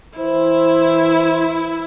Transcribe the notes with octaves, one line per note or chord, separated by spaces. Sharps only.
E3 E4 C5